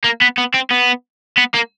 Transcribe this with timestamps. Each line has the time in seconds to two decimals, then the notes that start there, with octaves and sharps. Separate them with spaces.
0.04 A#3
0.22 B3
0.38 B3
0.55 C4
0.71 B3
1.37 B3
1.54 A#3